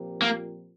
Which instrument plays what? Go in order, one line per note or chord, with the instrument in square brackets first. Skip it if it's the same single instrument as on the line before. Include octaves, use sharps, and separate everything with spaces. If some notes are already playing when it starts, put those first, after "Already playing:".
Already playing: [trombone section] A#2 F3 C4 G4 A#4
[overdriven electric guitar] A#3